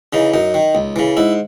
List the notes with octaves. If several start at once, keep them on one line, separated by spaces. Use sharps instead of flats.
C#3 E3 D#4
F#2 D#4
D#3
C#2
C#3 E3
G#2 E4